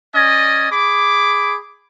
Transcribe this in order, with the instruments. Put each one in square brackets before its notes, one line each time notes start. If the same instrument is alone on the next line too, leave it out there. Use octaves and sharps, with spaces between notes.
[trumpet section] C#4 D5 D#5 G#5
G#4 B5 D6